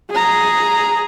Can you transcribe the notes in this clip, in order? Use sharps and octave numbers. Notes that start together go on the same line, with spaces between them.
G#4 A#5